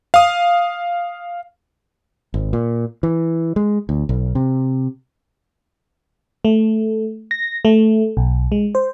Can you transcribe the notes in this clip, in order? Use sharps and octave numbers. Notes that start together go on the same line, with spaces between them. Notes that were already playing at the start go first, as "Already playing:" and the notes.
F5 D#6
G#1
A#2
E3
G#3
D2
B1
C3
A3
A#6
A3
B1
G#3
C5